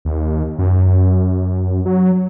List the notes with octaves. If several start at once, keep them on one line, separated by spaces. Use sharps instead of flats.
D#2
F#2
F#3